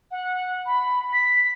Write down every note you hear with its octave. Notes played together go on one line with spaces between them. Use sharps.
F#5
B5
B6